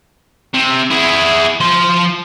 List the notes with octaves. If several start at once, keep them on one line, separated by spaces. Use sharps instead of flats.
C3
E4 G#4
F3 C6